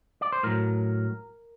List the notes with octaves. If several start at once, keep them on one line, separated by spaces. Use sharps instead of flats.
D5
C5
A2 F#3 A#4